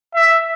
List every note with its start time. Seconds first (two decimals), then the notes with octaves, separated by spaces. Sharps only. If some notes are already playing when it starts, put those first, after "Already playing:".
0.15 E5